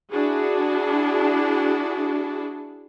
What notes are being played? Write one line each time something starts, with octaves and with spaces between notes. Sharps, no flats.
D4 E4 F#4 G#4